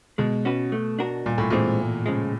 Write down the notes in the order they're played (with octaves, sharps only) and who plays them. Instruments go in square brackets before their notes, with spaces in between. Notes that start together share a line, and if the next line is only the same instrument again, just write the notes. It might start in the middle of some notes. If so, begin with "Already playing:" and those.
[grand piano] B2 [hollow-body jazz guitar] G#3
[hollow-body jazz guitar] C#4 F#4 B4
A3
D4 F#4 A#4
[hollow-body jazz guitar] G2 [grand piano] A#2
[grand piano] A2
[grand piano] A#2 [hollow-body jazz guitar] E3 G#3 C4 D#4
[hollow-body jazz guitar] E2
C#3 F3 G#3